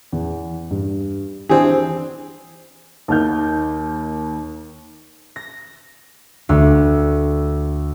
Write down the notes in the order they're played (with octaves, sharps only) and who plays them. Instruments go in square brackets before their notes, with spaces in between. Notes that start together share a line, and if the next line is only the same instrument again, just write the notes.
[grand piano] E2
G2
[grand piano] E3 D4 C5 [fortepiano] C4 G#4
[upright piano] D#2 D#3 F6 G6
[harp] A#6
D2